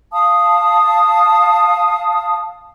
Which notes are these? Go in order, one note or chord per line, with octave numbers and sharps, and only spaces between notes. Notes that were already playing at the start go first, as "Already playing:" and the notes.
F5 A5 D#6